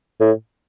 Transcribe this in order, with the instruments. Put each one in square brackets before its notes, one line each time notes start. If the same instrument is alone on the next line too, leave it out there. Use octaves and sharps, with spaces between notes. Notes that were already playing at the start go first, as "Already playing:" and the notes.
[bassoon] A2